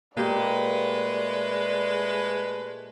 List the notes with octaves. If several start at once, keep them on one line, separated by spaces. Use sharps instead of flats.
A#2 G#3 A3 G4 B4 D5